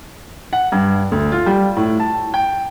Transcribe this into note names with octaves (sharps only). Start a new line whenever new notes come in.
F#5
G2
D2
F4
G3
A2
A5
G5